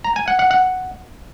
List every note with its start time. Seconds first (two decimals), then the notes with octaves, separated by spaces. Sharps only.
0.04 A#5
0.16 G#5
0.28 F#5
0.39 F#5
0.51 F#5